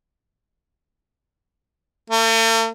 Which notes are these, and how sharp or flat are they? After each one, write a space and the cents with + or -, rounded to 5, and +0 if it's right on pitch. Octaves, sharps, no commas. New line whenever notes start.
A3 +45